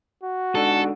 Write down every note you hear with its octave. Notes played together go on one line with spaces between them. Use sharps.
F#4
G#2 D3 A4